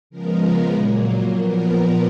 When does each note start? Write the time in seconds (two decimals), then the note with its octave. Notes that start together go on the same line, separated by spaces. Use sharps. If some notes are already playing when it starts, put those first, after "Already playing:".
0.10 C#3 F3 G#3 B3 A#4
0.72 A#2 F#3 A#3
1.35 A#2 F3 B3 A#4